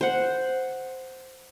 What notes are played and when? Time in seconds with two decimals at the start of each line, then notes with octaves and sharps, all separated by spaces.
0.01 C5 F#5